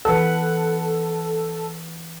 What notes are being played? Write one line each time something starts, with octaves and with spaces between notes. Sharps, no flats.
E3 A4 B4 F#5